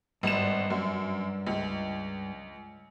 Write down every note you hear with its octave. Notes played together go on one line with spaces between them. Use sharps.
G#1 G2 E7
F#2
C#2